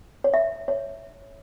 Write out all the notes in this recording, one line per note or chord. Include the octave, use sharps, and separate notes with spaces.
C#5
E5
C#5